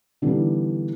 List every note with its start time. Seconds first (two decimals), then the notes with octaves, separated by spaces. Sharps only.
0.22 D3 E3 G3 B3 D#4